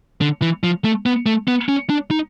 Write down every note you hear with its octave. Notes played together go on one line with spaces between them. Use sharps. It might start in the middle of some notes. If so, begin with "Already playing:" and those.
D3
E3
F3
A3
B3
A3
B3
C#4
D4
D#4